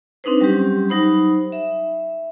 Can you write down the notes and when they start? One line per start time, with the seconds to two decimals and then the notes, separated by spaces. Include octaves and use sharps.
0.24 C4 D4 D#4 B4 C5
0.40 F#3 G3 C#4 G4
0.89 F#3 D#4 C5 B5
1.52 E5